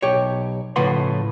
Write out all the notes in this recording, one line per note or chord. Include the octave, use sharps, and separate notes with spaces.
B1 G4 C#5
A2 C#3 F3 B4 F#5 C6